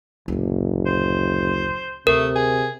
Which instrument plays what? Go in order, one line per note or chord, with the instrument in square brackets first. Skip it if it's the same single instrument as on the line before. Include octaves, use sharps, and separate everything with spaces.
[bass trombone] F#1 [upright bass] D2 A#2
[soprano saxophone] C5
[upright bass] D2 [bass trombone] C3 [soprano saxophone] A3 [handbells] A#4
[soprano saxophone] G#4